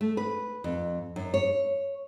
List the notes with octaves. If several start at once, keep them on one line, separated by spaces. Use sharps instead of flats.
A3
B4
F2
F#2
C#5